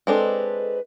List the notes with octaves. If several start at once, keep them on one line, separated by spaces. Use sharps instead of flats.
G#3 C4 D4 A4 B4 D#5